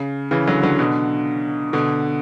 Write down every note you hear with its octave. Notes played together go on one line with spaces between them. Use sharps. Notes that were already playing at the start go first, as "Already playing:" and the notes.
Already playing: C#3
C#3 E3
D3 F#3
D3 F#3
B2 D3
B2 D3